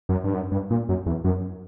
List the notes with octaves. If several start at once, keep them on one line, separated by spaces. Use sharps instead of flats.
F#2
G2
F#2
G2
A#2
F#2
E2
F#2